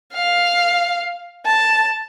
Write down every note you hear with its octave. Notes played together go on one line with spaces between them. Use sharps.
F5
A5